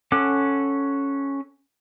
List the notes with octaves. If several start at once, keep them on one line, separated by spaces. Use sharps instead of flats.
C#4 A4 F#5 D6